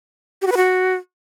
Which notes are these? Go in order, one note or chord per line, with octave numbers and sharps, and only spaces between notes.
G4
F#4
B4
F#4